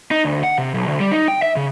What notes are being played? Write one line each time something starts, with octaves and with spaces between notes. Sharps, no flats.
D#4
D2
F#5
C3
B1
D2
G3
D#4
G5
E5
C#3